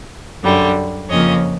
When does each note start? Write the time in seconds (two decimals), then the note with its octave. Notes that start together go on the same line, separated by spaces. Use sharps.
0.43 F#2 D3 G3
1.09 F2 C#3 F3 A#3 C#5 D#5